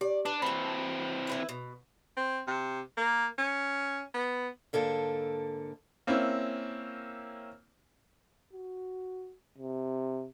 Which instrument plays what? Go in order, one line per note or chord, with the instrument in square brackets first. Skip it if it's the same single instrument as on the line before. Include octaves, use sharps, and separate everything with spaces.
[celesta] G4 [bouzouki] D5
[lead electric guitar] D4 [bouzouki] B4
[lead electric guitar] E3 C4 [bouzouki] F#4 A5 [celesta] B5
[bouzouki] E4 B4 E5
B2
[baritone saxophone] C4
C3
A#3
C#4
B3
[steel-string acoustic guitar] G#2 D3 A#3 A4
[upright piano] A#3 C4 C#4 E4
[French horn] F#4
C3